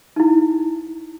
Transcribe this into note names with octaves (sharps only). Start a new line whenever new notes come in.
D#4 E4